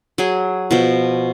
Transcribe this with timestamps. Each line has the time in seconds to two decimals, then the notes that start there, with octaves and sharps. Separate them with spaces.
0.18 F#3 G#4
0.71 B2 F3